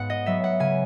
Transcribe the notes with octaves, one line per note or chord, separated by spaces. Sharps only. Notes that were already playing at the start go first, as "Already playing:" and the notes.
Already playing: G#2 B3 F#5
D#5
F#3 B3 E5
F#5
C#3 G#5